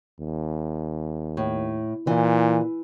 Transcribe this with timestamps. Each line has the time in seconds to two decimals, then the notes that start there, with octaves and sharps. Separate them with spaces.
0.20 D#2
1.37 A2
2.07 A#2 E3